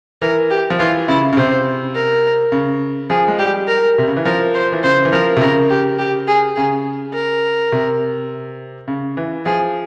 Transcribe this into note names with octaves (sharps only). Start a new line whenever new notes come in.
E3 A#4
G4
F3
E3 F4
C#3 E4
C#3
C3 C5
A#4
C#3
F3 G#4
G#3
G3 G4
A#4
C3
C#3
E3
F3 A#4
C5
E3
C#3 C5
E3
F3 A#4
C3
C#3 A#4
G4
G4
G#4
C#3 G#4
A#4
C3
C#3
E3
F3 G#4